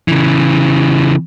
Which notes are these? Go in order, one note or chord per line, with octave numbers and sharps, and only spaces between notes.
C#3 E3